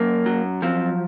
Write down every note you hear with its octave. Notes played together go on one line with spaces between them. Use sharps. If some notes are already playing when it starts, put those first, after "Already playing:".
Already playing: F#2 A#3
F#3
F3 C4